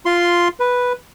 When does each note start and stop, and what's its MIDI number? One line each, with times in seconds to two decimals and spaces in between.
0.06 0.48 65
0.06 0.48 84
0.60 0.93 71